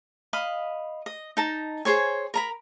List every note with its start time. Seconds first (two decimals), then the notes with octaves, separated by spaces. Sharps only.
0.33 D#5 F5 B5
1.06 D#5
1.37 D#4 A5 A#5
1.85 G#4 C5 C#5 G#5
2.34 A#4 A#5 B5